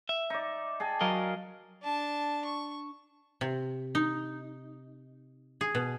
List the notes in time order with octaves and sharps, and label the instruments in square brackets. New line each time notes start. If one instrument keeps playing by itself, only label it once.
[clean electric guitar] E5
[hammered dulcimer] D#4 D5
G#4 G5 A5
[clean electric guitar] F#3 A#4 D#5 [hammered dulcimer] F5
[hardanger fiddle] D4 A5
C#6
[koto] C3
D#4
G#4
B2